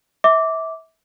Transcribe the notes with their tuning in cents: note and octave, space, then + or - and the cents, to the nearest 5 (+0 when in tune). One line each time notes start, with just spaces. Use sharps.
E5 -25 D6 -10